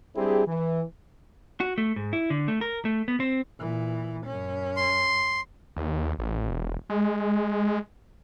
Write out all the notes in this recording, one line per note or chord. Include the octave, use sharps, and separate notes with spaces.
G3 C4 D4 E4 G4 G#4
E3
F#4
A3
G#2
E4
D3
A3
A#4
A3
B3
C4
A#2 E3
F#2 C#4
C6
D#2
A1
E1
G#3